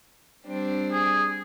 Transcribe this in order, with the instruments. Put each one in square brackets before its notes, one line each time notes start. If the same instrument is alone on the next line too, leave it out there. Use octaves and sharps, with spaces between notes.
[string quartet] G3 C4 D4
[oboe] G#4